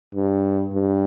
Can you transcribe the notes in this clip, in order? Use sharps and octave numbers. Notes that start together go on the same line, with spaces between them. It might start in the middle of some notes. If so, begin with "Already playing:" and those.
G2
G2